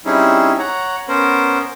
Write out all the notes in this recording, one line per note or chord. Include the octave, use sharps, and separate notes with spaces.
G3 C4 C#4 D#4 E4 G#4
C#5 F#5 A#5
B3 C#4 A#4 C5